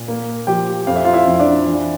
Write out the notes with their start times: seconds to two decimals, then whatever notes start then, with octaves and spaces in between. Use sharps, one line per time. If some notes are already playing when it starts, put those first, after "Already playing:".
Already playing: A#2
0.08 A#3
0.47 F3 G4 G5
0.87 F2 F5
0.96 E5
1.04 F4 F5
1.13 E4 E5
1.27 F2
1.39 D4 D5
1.66 E3